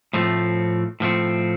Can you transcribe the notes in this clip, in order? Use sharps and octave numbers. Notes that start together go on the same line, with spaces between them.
A2 F3 A3 C4
A2 F3 A3 C4